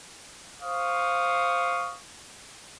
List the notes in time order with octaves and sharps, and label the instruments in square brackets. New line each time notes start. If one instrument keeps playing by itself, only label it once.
[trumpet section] C5 F5 C#6 D#6